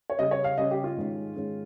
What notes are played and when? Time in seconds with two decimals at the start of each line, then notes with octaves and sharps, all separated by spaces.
0.10 C#5
0.19 C#3 G3 C#4 D#5
0.31 C#5
0.44 F5
0.57 C#3 G3 C#4 D#5
0.71 G4
0.84 F4
0.97 G#2 D#3 G#3 C#4
1.36 G#2 D#3 G#3 C#4